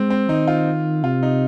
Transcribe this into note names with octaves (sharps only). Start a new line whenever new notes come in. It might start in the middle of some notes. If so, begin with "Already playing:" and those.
Already playing: G#3 C4
C4
D#3 D#4
F4
C3 F4
D#4